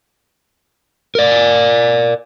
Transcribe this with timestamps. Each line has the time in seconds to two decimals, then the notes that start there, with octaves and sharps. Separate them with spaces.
1.15 A#4 D5